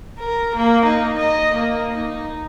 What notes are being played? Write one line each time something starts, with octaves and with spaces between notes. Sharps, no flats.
A#4
A#3
D#4
D#5
A#3
D#4